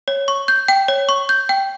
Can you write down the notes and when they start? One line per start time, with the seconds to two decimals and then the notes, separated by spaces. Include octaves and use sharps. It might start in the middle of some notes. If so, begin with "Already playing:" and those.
0.08 C#5
0.28 C#6
0.48 G6
0.68 G5
0.88 C#5
1.09 C#6
1.29 G6
1.49 G5